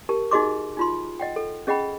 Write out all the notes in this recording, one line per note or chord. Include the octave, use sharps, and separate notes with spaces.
G4 A#4 A5
D#4 F#4 G#4 D#5 C6 D6
D#4 F4 C6
D#5 F#5 G5
A4
C#4 G#4 D#5 F#5 G5 B5